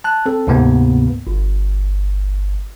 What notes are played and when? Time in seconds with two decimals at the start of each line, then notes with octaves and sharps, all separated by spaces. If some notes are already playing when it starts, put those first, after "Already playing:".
0.04 A5 F#6
0.26 C4 A4
0.47 D2 G#2 C3 A#3 B3
1.27 G1